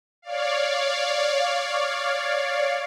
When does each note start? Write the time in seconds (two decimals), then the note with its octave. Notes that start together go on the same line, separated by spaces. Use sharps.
0.22 C#5 D5 F5